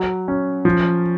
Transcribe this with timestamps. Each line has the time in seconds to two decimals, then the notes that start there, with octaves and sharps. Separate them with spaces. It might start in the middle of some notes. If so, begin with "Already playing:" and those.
Already playing: F#3
0.28 C#4
0.65 F3